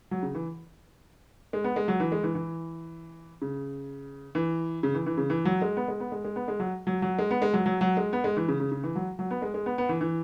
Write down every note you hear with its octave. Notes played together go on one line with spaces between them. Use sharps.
F#3
C#3
E3
G#3
B3
G#3
F#3
E3
G#3
E3
E3
C#3
E3
C#3
E3
E3
C#3
E3
F#3
G#3
B3
G#3
B3
G#3
G#3
B3
G#3
F#3
F#3
F#3
G#3
B3
G#3
F#3
F#3
F#3
G#3
B3
G#3
E3
C#3
C#3
C#3
E3
F#3
F#3
B3
G#3
G#3
B3
B3
E3
E3